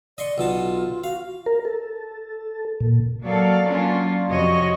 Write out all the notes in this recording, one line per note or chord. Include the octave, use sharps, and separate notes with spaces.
D5 D#5 C6 C#6
B1 B2 F4 A5
F#4 F5
A#4
A4
A#2
F#3 A#3 A4 D5 F5
F#3 A#3 C#4 D4 F4
F2 C3 F#4 C#5 D#5